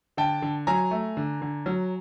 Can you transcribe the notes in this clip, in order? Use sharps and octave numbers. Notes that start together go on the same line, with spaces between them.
D3 G5 A5
D3
F#3 G#5 A#5
A3
D3
D3
F#3